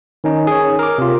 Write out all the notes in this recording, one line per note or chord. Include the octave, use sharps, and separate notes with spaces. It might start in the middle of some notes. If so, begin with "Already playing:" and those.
D#3 C#4 D#4
G#4 C#5
A#4 D6
C3 F4